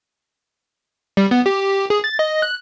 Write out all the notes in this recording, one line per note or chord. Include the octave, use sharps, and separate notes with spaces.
G3
B3
G4
G#4
A6
D#5
F#6